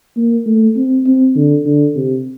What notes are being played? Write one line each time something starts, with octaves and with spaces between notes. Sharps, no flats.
A#3
A3
C4
C4
D3
D3
C3